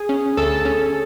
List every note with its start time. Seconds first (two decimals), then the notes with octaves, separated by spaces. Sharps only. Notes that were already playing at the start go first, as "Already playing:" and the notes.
Already playing: G#4
0.09 C#4
0.37 D2 A4
0.65 C#4